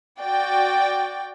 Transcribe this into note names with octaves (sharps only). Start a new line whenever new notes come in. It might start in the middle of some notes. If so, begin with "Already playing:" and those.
F#4 D5 G5